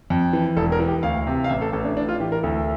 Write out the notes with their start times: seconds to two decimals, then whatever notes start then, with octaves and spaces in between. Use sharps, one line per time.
0.10 F2
0.33 E3
0.56 E1 A4
0.72 A#4
0.80 E3
0.88 G4
1.03 D2 F5
1.27 C3
1.44 F5
1.50 A1 E5
1.61 A4
1.73 A1 A4
1.85 D4
1.96 A2 D4
2.09 F4
2.20 E3 G4
2.32 A#4
2.43 D2 A4